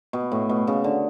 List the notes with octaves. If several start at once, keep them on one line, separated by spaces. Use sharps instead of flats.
B2
A2
B2
C#3
D3